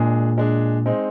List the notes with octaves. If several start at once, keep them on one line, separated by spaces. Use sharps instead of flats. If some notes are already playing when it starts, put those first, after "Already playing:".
Already playing: A#2 G#3 D4 G#4
G#3 D4 G#4
G#3 C4 D#4